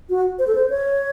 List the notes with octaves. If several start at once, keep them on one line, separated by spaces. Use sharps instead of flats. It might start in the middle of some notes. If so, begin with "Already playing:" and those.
F#4
C5
A4
C5
C#5